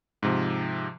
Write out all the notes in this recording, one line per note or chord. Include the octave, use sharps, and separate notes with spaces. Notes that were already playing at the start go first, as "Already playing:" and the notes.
G#2 C3 F3